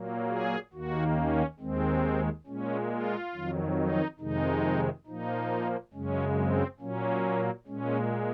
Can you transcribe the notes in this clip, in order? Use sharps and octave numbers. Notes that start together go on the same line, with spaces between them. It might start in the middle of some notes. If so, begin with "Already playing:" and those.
Already playing: A#2 F#3 A#3
G#4
D#2 D#3 A#3 F#4
C#4
D#2 D#3 G#3 C4
A#2 G#3 C#4
F4
F2 D#3 F#3
D#4
F2 C3 D#3 G#3 D#4
A#2 F3 A#3 D#4
F#2 C#3 G#3 C#4
C4
A#2 F#3 A#3 C#4
A#2 G#3 C#4